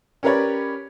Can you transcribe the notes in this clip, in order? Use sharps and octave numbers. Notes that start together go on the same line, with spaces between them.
C#4 G4 A#4 B4 C#5 D5